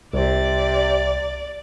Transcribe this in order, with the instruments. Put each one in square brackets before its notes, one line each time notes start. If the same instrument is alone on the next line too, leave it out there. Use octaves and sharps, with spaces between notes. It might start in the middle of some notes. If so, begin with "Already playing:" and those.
[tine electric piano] C2 [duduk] C3 [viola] D5